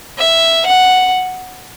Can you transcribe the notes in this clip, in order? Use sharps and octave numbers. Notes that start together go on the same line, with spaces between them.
E5
F#5